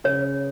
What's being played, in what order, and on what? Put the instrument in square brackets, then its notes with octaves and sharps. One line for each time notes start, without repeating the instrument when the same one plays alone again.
[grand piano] C#3 [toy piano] C#5